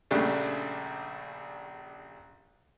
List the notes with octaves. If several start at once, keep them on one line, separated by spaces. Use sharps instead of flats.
A#1 C#3 G3 A3 D4